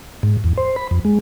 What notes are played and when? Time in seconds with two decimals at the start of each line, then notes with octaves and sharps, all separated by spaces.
0.23 G#2
0.44 E2
0.58 C5
0.76 B5
0.91 F2
1.05 G#3